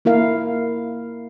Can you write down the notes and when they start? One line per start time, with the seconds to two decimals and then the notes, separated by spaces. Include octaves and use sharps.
0.05 A#3 E4 A#4 F5